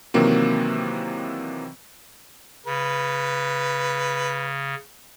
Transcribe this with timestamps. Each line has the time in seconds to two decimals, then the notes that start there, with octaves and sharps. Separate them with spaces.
0.14 C3 D#3 E3 F#3 A#3 C4
2.66 C#3 B4